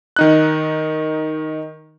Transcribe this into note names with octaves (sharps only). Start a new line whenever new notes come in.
D#3 D#4 F#6